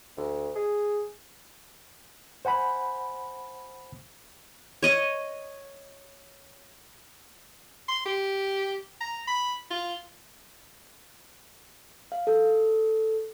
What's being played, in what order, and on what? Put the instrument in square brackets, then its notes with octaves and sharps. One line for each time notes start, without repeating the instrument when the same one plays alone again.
[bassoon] D2
G#4
[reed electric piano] C5 F#5 G#5 B5
[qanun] C#5 D#5
[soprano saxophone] C6
G4
A#5
B5
F4
[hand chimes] F5
A4